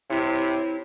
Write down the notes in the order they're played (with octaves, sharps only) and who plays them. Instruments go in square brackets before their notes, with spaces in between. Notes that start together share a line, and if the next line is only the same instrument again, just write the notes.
[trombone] C3 [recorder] E4 [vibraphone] C#5 C6